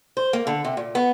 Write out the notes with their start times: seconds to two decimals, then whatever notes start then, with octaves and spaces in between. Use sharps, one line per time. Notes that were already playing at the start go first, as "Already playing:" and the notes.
0.17 C5
0.33 A#3
0.47 D3
0.65 C3
0.77 A#2
0.95 B3